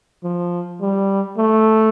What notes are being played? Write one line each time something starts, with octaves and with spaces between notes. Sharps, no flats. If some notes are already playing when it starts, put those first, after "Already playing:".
F3
G3
A3